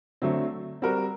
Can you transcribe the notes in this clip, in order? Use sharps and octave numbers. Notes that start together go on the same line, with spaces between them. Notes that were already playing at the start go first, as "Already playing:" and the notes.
D3 F#3 A3 C4
G3 C4 F#4 A#4